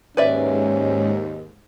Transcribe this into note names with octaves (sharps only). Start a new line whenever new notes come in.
D#2 G#2 C#4 B4 D5 E5